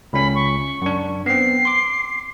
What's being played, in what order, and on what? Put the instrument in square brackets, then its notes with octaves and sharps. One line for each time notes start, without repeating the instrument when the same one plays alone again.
[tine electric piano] C#2 C#4 [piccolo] B5
[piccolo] C#6
[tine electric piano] F#2 D4
[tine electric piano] B3 C4 [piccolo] C7
[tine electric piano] C6 D6